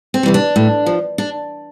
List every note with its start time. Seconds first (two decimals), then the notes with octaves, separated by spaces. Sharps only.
0.14 C4
0.23 C3 E3 G3
0.34 D4
0.56 A2
0.87 F3
1.18 D4